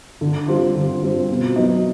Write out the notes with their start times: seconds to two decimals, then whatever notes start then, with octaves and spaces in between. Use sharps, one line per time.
0.21 D3
0.48 G3 C4 F4
0.75 D3
1.02 G3 C4 F4
1.29 B2
1.56 F#3 B3 D#4